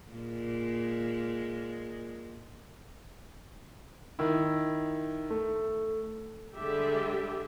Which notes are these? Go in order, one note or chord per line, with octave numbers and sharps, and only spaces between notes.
A#2 G#3
D#3 E4
A3
D3 G3 G#3 G4 E5